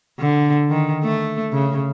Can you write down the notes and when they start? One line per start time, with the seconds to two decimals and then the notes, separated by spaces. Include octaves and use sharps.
0.19 D3
0.71 D#3
1.03 A3
1.52 C#3